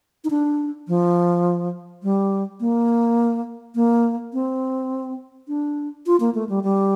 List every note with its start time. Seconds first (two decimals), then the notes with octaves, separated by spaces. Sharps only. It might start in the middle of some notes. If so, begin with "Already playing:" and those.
0.24 D#4
0.30 D4
0.88 F3
2.03 G3
2.60 A#3
3.75 A#3
4.33 C4
5.48 D4
6.06 F4
6.20 A#3
6.35 A3
6.49 G3
6.64 G3